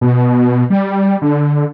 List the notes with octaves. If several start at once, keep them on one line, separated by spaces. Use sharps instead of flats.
B2
G3
D3